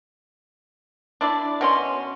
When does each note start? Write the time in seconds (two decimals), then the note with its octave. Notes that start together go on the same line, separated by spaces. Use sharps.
1.21 D4 E4 D5
1.61 B2 C#4 C6